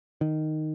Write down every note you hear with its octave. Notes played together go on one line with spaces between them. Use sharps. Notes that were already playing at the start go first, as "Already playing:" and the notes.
D#3